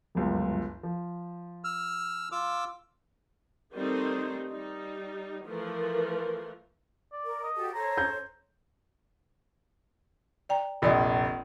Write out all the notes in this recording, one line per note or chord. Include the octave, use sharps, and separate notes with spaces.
G1 C#2 F#2
F3
E6 F6
F4 D6 E6
D#3 G3 A3 C4 D#4 C5
G3 D#4
E3 F3 A3 A#4
D5
A#4
D#5
F#4 G4 A4
A4 C5 C#5 A#5
G6
D5 G5 A#5
F1 A#1 F4 D5 D#5